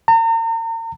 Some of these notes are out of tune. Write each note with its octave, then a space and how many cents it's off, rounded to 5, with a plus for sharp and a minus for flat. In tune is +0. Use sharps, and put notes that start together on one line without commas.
A#5 -40